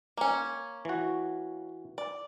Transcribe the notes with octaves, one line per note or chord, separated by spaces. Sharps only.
A#3 C#4
E3 F#4
D5